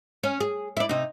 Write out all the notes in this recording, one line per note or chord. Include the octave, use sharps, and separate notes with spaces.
C#4
G#4
E4 D5
C3 D#4